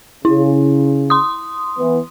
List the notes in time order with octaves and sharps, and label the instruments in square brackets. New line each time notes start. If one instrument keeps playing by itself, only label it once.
[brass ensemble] C#3 [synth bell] E4
[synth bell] C6 D#6
[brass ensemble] E3 B3